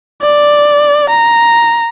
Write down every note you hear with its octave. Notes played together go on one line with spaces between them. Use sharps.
D5
A#5